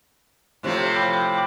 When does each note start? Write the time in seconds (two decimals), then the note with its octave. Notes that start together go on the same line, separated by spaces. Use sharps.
0.63 A2 C3 F3
0.95 G5 B5 D6